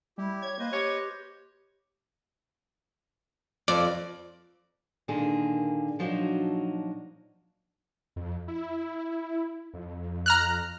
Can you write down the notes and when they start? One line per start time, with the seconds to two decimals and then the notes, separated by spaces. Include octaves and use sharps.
0.18 G3 E4 G4
0.42 C#5 G#6
0.59 A#3 B4 C5 D#5
0.73 G4 C#5
3.68 F2 D5
5.08 A#2 D3 D#3 A#3 G#4
5.99 A#2 F3 F#3 D4 D#4 F#4
8.16 F2
8.48 E4
9.74 F2
10.26 A#5 F6 F#6